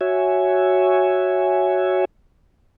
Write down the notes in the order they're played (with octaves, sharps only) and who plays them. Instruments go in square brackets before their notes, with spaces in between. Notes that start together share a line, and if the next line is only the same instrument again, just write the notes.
[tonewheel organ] F#4 C#5 E5 G#5